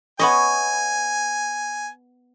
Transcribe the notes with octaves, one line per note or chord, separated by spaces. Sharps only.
B3 C#5 D#5 G#5